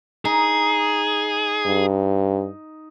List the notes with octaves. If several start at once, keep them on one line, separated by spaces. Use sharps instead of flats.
D#4 G#4
G2